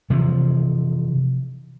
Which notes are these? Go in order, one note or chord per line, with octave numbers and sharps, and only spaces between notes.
C3 E3 F3